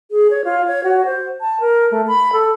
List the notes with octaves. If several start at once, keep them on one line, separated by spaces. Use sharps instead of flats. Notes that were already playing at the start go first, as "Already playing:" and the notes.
G#4
C#5
F4
C#5
F#4
C5
A5
A#4
A3
B5
A4